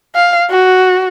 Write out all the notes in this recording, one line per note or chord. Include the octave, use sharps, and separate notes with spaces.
F5
F#4